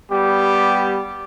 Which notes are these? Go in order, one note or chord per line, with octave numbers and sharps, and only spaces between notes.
G3 B3 G4